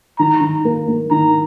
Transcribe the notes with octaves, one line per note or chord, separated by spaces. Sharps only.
D#3 A#5
D#3
A#3
A#3
D#3 A#5